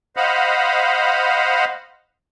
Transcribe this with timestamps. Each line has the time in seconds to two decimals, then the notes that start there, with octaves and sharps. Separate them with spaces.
0.17 C5 D#5 F5 F#5 B5